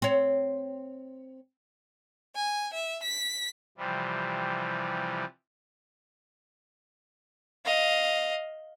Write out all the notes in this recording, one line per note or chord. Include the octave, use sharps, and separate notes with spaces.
C4 C#5
G#5
E5
B6
C3 E3 F3 G3
D#5 F5